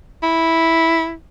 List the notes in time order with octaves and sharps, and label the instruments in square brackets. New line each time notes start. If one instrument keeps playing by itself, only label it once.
[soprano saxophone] E4